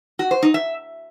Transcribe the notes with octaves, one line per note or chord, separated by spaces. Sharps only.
F#4
C5
D#4
E5